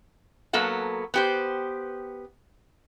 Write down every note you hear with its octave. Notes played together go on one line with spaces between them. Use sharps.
F#3 A#3 B3 A4 F#5
B3 G4 C5